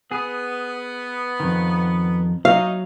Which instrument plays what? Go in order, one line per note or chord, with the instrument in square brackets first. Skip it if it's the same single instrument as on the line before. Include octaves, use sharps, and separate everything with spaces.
[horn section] B3 [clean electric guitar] G#4
[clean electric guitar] F2 D#3
[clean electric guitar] F#3 [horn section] D#4 [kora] F5